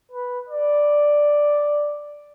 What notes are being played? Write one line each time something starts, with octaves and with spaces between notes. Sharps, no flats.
B4
D5